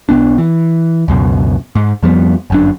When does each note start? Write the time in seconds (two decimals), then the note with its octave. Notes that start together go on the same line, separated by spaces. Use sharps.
0.09 B1 A2 B3 D4
0.38 E3
1.08 C#2 F#2 B2
1.75 G#2
2.03 F2 F3 G3 B3
2.50 G1 F#2 D4